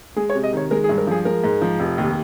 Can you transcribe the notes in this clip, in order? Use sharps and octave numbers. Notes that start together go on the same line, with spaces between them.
G#3 G#4
C#5
C3
D#5
D#3 C#5
G#3 A#4
G#4
G2
A#4
F3 G#4
G#3 A#4
G#2
F3
F1
D#2